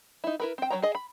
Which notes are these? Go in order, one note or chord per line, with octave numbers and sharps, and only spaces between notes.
D#4 E4
E4 A#4 B4
C4 G5
F#3 D4 C#5 G5 A#5
G#4 D#5
B5